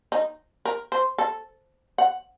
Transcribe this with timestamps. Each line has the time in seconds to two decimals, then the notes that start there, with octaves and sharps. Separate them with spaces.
0.12 D#4
0.65 A#4
0.92 C5
1.18 A4
1.98 F#5